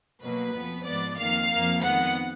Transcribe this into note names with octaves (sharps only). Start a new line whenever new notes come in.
B2 F#3 A#3 B4
F2 F3 B3
G#2 F3 B3 D5
F2 D#3 A#3 F5
F2 F3 A#3
F2 D#3 G#3 B3 F#5